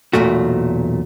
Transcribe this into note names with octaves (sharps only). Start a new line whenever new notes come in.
B1 E2 A#2 A3 F#4